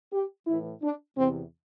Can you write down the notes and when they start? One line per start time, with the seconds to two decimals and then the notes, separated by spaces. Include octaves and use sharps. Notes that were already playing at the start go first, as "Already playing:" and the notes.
0.12 G4
0.47 A2 E3 E4
0.83 D4
1.17 E2 C3 E3 C4